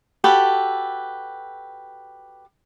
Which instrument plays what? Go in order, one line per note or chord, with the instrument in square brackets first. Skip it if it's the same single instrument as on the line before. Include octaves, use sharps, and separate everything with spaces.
[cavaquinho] F#4 G4 A4 B4